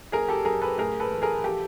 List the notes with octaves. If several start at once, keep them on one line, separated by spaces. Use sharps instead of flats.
F#1 G#4 A#4
G4 A4
F#2 G#4 A#4
A4 B4
A2 G#4 A#4
A4 B4
E3
G#4 A#4
F3 G4 A4